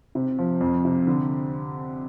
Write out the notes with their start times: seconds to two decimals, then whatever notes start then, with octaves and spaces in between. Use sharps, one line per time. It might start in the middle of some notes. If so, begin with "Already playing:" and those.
0.15 C3
0.39 F3
0.61 F2
0.85 C3
1.07 D3